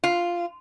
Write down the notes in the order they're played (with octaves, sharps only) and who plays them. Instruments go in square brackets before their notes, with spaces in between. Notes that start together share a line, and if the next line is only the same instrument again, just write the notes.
[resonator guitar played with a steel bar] F4